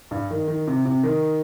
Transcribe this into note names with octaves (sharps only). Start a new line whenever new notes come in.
G2
D#3
D#3
C3
C3
D#3